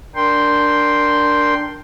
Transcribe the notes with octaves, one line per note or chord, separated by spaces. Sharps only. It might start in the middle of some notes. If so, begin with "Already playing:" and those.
D4 A#4 G5 C6